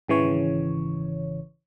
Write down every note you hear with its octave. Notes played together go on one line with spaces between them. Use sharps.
G#1 C#3 E3 C#5